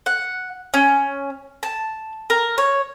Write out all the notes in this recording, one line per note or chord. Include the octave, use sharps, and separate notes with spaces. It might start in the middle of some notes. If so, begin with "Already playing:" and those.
F#5
C#4
A5
A#4
C#5